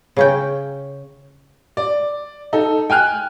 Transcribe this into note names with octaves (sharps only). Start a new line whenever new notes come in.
C#3 C#4 G5
D5
D#4 A4
G5 G#5 F6 F#6